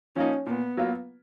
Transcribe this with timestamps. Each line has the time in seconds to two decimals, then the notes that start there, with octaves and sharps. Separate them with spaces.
0.16 F3 A#3 C#4 D#4
0.46 A#2 B3
0.77 F#3 A#3 F4